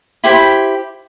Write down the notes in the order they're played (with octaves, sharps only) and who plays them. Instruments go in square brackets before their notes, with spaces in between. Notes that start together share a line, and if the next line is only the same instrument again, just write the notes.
[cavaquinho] E4 G4 C5 B5